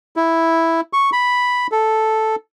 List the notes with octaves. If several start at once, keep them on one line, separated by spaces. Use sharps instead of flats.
E4
C#6
B5
A4